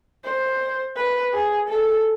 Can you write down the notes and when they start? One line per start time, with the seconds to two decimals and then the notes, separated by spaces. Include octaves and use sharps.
0.24 C5
0.96 B4
1.33 G#4
1.69 A4